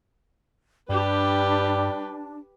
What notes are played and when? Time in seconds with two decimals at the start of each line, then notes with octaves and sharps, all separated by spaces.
0.89 G2 G3 D4 G4 B4